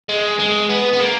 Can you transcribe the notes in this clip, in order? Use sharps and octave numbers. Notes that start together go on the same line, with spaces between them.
G#3
G#3
B3
B3
A#3